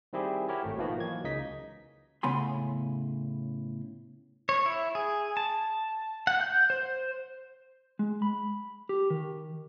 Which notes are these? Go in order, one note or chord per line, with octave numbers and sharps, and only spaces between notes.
D#3 G3 C4 E4 G4 G#4
E4 F#4 G4 A#4 C#5
G#1 A3
B2 D#3 F3 A#3 B3 F#4
E3 F#3 A#3 G#6
C#2 C#3 D#4 D#5 B6
A2 C#3 B3 G#5 B5 C6
C#5
E4
G#4
A5
F#5
G6
C5
G#3
B5
G4
D#3